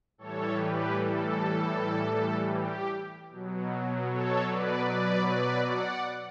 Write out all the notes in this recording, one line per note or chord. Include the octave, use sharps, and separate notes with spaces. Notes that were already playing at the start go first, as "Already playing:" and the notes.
A2 E3 G3 A4 C#5
G4 B4
A4
G4
B2 F#3
A4 C#5
B4 D5
B4 D5
B4 D5
D5 F#5